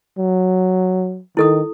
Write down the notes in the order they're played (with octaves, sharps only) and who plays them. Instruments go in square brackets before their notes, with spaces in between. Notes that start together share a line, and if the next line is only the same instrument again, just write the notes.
[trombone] F#3
[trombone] D#3 [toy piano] E4 A4 D#6